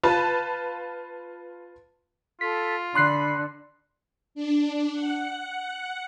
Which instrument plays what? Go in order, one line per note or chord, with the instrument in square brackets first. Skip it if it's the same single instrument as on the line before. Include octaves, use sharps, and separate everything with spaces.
[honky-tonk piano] F4 B4 A5
[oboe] F4 [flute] A4 [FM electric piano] B6
[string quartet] D3 [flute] B5 [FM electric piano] C6 F#6 C7
[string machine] D4
F#5